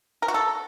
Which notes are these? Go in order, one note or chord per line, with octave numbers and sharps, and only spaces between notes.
A#4
F#4
A4